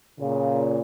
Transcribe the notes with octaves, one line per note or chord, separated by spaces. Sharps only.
A#2 C#3